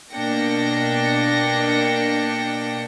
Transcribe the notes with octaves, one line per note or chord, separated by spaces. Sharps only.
B2 A#3 D4 G5 A#6 C#7